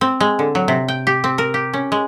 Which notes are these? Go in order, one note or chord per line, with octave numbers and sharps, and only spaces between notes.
C4
G#3
D3
F#3
C3
G5
G4
C4
A#4
G4
C#4
G#3